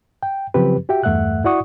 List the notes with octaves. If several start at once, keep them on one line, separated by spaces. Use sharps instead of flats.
G5
C#3 F3 F#3 C4 G4 B4
F#4 G4 E5 G5
E2 G2 A3 E5 F#5 F#6
E4 F#4 D5 F#5 C#6 D#6